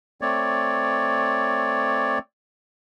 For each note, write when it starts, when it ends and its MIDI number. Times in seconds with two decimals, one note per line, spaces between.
0.21 2.18 57
0.21 2.18 60
0.21 2.18 73
0.21 2.18 74